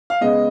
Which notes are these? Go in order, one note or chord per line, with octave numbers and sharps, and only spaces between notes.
F5
C#3 G#3 B3 D#5